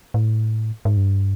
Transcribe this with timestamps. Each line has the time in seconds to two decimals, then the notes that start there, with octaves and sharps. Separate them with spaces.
0.14 A2
0.85 G#2
0.97 G2